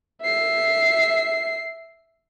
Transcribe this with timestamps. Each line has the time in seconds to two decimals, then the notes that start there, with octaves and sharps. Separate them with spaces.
0.21 E5 C7